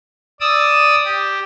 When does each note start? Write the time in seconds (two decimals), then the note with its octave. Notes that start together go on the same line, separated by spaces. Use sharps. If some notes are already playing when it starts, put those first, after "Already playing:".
0.41 D5 D#6 E6
1.05 G4